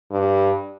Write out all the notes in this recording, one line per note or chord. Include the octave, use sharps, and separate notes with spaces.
G2